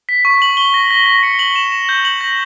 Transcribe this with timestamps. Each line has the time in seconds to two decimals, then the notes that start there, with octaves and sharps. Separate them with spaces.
0.09 B6
0.25 C#6
0.42 F#7
0.57 G7
0.74 A#6
0.91 A#6
1.06 A#6
1.23 C#7
1.39 F#7
1.56 E7
1.72 E7
1.89 G6
2.05 F#7
2.21 A#6